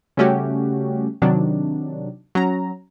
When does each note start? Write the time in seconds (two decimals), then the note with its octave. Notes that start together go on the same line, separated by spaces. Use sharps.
0.17 C#3 G3 A3 C#4 F#4 G4
1.22 C3 D#3 F#3 D4
2.35 F#3 C#4 A#5